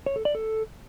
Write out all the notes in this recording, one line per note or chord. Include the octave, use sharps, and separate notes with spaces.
C#5
A4
D5
A4